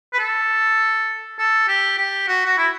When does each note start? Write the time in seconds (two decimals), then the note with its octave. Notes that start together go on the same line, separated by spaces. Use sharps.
0.13 B4
0.19 A4
1.39 A4
1.68 G4
1.97 G4
2.28 F#4
2.46 F#4
2.58 E4